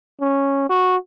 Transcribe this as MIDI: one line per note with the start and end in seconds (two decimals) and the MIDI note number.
0.21 0.67 61
0.70 0.96 66